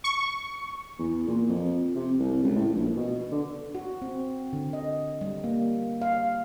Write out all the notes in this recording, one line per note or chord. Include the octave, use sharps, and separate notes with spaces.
C#6
E2
A#2
F2
C3
C2
C#2
A2
A#1
B2
D3
F#4
C4
D3
D#5
G3
A#3
F5